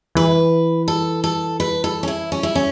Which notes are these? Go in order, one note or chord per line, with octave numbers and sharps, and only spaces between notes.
E3 B4
A4
A4
B4
A4
C#4
E4
F#3 C#4
E4
C#4